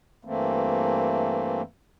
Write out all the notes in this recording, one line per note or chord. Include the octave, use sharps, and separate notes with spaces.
G2 E3 A3 A#3 C4